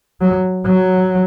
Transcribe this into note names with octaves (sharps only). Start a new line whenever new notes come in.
F#3
F#3